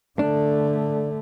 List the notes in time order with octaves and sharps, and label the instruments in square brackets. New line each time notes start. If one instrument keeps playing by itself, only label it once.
[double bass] D3 A3 [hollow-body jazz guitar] D4